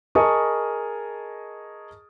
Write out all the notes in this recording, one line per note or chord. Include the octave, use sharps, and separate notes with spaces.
G#4 A#4 D#5 A5 C#6 D#6